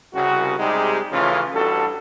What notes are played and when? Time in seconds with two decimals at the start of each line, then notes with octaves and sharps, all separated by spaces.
0.14 C2 C#3 F#4
0.59 C3 G3 G#3 D#4 G4 G#4
1.11 C#3 E3 F3 A3 C#4 F4
1.54 A1 G2 F#4 A4